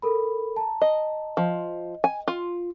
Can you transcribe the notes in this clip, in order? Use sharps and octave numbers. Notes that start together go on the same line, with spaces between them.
A4 A#4 B5
A5 A#5
D#5
F3 D#5
G#5
F4